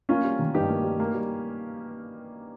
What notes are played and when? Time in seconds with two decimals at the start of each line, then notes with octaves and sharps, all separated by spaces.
0.09 A#3 C#4 F4
0.24 G3
0.39 D#3
0.54 G2 D#4 G4
0.69 A#3
0.84 G3
1.00 A#3
1.15 G3